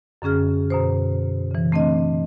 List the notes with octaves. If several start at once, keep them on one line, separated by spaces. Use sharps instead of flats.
F#2 D3 C#4 G#4 F6
F#2 B2 C5
C#3 E3
A3 C4 D4 D#5